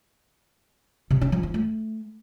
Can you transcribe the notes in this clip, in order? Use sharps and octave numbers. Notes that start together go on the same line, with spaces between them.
C3
C#4
F3
F4
A3